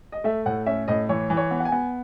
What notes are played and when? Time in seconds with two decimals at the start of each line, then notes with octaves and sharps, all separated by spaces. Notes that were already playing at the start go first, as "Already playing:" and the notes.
0.12 D#5
0.24 A3 E5
0.46 A2 F#5
0.66 C#4 E5
0.88 A2 D#5
1.09 E3 C#5
1.30 E3
1.37 C#5
1.51 B3
1.60 F#5
1.65 G#5
1.72 B3